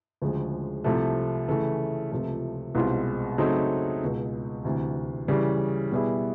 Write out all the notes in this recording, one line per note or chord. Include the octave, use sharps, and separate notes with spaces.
D2 C#3 F3 G#3
C2 C3 F3 A3
C#3 E3 A3
C#2 C3 F3 A3
C2 B2 G#3 C4 F4
C#3 F#3 A3 C4 D#4
C#2 B2 G#3
D2 C3 E3
C#3 E3 G3
B2 G3 B3 E4 G#4